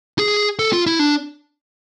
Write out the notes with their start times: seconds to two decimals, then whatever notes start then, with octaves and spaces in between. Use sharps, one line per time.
0.19 G#4
0.59 A4
0.73 F4
0.86 E4
0.99 D4